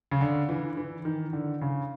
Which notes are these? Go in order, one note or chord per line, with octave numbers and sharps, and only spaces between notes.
C#3
D3
E3
E3
D#3
D3
C#3